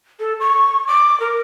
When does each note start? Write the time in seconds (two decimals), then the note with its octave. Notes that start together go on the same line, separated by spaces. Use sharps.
0.20 A4
0.40 C#6
0.87 D6
1.20 A#4